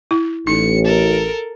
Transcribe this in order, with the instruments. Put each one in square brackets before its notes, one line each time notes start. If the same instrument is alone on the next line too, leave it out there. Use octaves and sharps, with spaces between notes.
[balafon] E4
[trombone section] A1 [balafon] D#4 [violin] C#7
[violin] A4 A#4